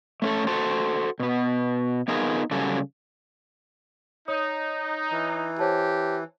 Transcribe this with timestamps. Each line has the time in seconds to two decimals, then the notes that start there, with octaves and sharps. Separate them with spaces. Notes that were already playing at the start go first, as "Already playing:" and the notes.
0.22 A3 C#4 A4
0.47 F#4 A4 C5
1.20 B2 B3
2.08 B3 D#4 F4 G#4 A#4
2.51 C#3 F#3 G3 A4 G#5
4.28 D#4 C#5 D#6
5.12 E3
5.59 G4 C5 C#5 A5